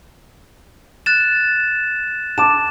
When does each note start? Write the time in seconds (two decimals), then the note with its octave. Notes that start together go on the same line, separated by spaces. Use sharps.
1.06 F#6 A6 E7
2.38 A5 D6 E7